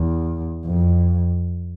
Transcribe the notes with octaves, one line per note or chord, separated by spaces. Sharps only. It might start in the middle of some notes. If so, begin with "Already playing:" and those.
Already playing: E2
F2